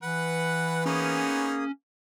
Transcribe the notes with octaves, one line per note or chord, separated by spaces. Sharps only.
E3 B4 F#5
A#3 B3 C#4 D#4 G#4 C#5 D#6